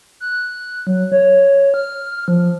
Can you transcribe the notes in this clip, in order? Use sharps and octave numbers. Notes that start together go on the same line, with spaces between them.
F#6
F#3
C#5
F6
F3